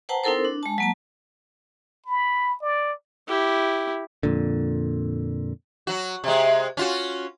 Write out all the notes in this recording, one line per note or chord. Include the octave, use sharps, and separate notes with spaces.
B4 C5 F#5 G5 A5 A#5
C4 D#4 E4 A4 A#4 C5
D4
G#3 A5
F#3 A#3 A5
B5
D5
E4 G4
F2 A#2 D3
F#3 F#4
C3 G#3
C#4 F4 F#4